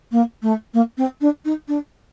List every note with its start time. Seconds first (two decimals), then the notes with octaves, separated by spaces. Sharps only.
0.11 A#3
0.42 A3
0.73 A#3
0.97 C4
1.21 D4
1.44 D#4
1.68 D4